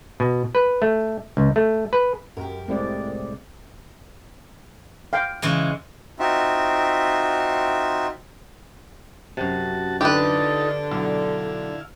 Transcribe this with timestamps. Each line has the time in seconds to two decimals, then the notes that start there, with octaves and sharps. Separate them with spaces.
0.20 B2
0.55 B4
0.82 A3
1.37 C#2
1.56 A3
1.93 B4
2.37 F#2 G4 A#4
2.68 C2 A2 C3 G#3 C4 D5
5.13 F5 G5
5.42 C#3 E3 G#3
6.19 C4 D#4 F4 F#4 E5
9.37 F#2 C3 F#4 A5
10.01 D3 D#4 F4 G4 A4 B4
10.91 B1 E4 F5